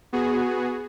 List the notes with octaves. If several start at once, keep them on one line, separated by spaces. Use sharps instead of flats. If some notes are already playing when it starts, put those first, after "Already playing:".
B3 F#4 G#4